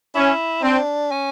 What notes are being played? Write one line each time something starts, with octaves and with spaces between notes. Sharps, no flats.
C#4 E4
C4 D4
C#4